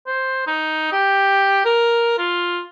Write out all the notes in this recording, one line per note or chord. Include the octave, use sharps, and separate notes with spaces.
C5
D#4
G4
A#4
F4